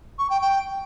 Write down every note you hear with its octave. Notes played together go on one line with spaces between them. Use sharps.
C#6
G5
G5